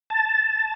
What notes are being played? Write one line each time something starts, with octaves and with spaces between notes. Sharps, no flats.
A5